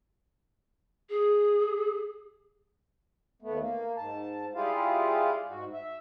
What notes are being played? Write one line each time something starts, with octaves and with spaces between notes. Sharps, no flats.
G#4
D#2 A3 B3
A#3
G#2 A5
G3 E4 F4 G4 G#4 F5
G#2 F#4
E5